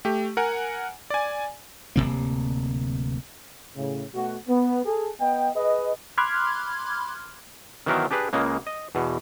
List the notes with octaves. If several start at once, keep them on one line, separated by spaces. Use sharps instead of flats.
A3 G4
A#4 F#5 G#5
D5 G#5
D1 D#2 C3 A#3
A2 C#3
B2 A3 F#4
B3
G#4 A4
B3 D#5 G5
G#4 B4 D#5
B5 C6 D6 F6 F#6 G#6
D#3 E3 F#3 B3 A#4 C5
D4 G4 G#4 B4
C#2 C#3 G#3 A#3
D#5
E2 B2